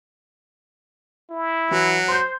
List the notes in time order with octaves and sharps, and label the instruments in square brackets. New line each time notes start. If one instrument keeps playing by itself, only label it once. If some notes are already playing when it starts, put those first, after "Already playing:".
[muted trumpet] E4
[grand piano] E3 F#4 [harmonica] F#3
[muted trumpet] C5 [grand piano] C6 G6